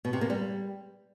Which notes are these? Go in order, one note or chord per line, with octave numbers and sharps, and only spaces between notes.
B2
C3
A#3
G3